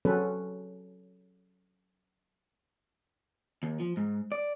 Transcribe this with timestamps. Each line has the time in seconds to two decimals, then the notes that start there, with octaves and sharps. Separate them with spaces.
0.05 F#3 C4 C#4 A4 B4
3.63 D#2
3.80 F3
3.97 G#2
4.32 D5